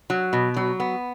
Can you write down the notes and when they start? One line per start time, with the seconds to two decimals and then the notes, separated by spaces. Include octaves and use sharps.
0.10 F#3
0.33 B2
0.57 F#3
0.80 B3